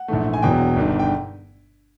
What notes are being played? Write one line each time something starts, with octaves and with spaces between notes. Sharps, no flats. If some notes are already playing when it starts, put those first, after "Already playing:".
Already playing: F#5
A#1 G#2 E3 A3
G#5
E1 E2 B2 F#3 G5
G1 G2 D#3
G5